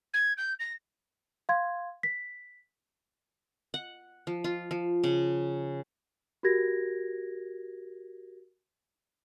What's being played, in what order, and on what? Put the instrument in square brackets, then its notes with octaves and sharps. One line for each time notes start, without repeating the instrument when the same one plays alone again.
[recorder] G#6
G6
A#6
[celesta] F5 C6 G#6
B6
[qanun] F#5
F3
F4
F3
C#3
[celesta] F#4 G4 A#4 G#6 A#6